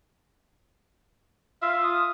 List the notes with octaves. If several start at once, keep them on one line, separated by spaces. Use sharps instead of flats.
F4 E5
D#6